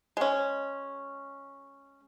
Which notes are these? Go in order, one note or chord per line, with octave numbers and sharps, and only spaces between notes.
G#3 C#4